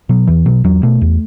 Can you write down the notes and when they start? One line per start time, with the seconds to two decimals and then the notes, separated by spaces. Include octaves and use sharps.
0.09 B2 F#3
0.27 E2 E3
0.46 B2 F#3
0.64 E2 F#3
0.83 B2 A3
1.02 E2